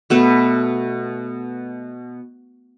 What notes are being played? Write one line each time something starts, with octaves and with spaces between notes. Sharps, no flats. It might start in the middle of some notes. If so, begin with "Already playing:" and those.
B2 A3 B4